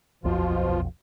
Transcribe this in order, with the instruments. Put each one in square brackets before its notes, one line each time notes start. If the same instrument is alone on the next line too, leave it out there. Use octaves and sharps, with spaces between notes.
[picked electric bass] D#1 B1 F2 [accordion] B2 F3 F4